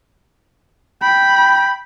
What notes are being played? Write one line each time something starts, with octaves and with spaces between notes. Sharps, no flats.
G5 B5